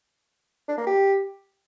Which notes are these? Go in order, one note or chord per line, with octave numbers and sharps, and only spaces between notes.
D4
A#3
G4